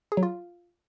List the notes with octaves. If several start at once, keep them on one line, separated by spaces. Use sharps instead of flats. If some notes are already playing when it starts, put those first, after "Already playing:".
G#4
F#3
F4